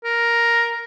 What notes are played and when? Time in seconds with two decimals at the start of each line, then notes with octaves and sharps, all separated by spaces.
0.05 A#4